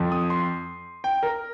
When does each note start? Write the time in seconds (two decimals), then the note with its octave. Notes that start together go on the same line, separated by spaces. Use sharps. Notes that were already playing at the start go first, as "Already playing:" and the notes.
Already playing: F2 F3
0.12 D#6
0.30 C6
1.04 G5
1.23 A#4